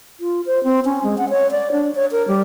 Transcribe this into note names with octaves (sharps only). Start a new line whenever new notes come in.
F4
C5
C4
C#4
G#3
F#5
C#5
D5
D4
C#5
A#4
G3